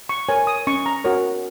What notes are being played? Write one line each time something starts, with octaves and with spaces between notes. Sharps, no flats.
C#6
A#4 C#5 G#5
D#6
C#4 C#6
A#5
F#4 A#4 C#5